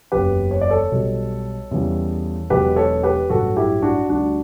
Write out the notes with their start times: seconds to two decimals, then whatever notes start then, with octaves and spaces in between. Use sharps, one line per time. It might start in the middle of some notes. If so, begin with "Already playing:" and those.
0.12 F#1 E2 C#3 F#3 G4 B4
0.51 C#5
0.61 D5
0.70 A4 C#5
0.91 B1 B2 G3
1.71 E2 C#3 E3 G3
2.50 E1 E2 B2 F#3 G4 B4
2.76 A4 C#5
3.03 G4 B4
3.29 A1 G2 F#3 F#4 A4
3.57 E4 G4
3.82 D4 F#4
4.09 D2 D3 G3 D4 F#4